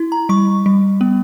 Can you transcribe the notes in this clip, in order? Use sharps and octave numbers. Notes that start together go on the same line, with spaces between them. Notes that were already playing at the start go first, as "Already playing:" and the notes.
Already playing: E4
A#5
G3 C#6
G3
B3